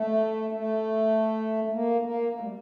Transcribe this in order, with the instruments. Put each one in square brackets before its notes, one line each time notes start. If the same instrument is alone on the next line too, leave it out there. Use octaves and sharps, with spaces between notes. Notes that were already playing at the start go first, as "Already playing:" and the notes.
Already playing: [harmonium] A3
A3
A#3
A#3
A3
G3